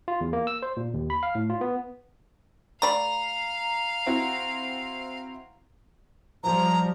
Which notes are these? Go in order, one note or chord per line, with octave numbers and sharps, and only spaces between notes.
F4
E2
A#3
E6
C5
A#2
D#2
B5
F5
A2
F4
B3
A3 D5 F5 A#5 B5
C4 E4 F#4
F3 G3 A#5